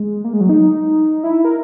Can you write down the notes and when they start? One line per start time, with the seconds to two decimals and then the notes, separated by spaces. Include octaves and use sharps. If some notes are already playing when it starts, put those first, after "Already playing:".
Already playing: G#3
0.24 A#3
0.33 G#3
0.41 F#3
0.49 D#4
1.24 E4
1.45 A#4